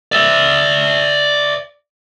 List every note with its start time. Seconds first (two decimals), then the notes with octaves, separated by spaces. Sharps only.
0.12 D5 E5